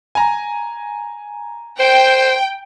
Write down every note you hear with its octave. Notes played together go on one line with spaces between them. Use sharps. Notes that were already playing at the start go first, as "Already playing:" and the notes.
G#5 A#5
C5 G5